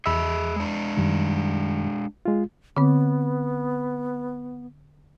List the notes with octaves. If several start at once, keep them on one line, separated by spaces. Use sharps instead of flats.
E2 G#4 D#5 E5 B5 E6
G#3 D4
F#2 D#3 G3
G#3 F4
D3 B3 C4